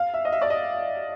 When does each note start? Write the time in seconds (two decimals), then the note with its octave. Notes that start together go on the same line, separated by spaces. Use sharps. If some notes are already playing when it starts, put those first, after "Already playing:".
Already playing: F5
0.14 E5
0.25 D#5
0.32 E5
0.41 D5
0.50 D#5